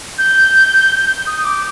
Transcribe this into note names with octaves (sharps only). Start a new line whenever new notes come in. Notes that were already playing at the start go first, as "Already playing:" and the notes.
G6
D#6
D6